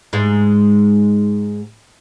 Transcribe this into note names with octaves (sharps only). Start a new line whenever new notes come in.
G#2 G#3